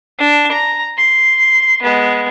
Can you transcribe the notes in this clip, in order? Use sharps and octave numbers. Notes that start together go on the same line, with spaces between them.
D4
A#5
C6
G#3 B3